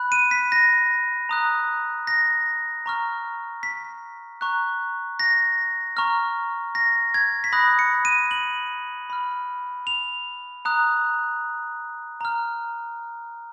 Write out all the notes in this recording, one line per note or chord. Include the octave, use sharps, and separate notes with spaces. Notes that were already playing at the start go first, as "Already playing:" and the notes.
Already playing: B5 F#6
D#7
B6
A#6
A#5 D#6 F#6
A#6
A#5 C#6 F6
B6
A#5 C#6 F#6
A#6
A#5 C#6 F6
A#6
G#6
B6
B5 D#6 F#6 A#6
C#7
D#7
F#7
B5 F6
F7
A#5 D#6 F#6
A#5 F6